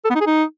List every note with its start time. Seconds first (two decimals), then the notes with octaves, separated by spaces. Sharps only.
0.05 A4
0.10 B3
0.15 D#4
0.21 G#4
0.26 D#4